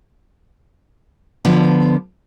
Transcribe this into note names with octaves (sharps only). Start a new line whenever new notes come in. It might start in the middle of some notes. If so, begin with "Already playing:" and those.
D3 F3 B3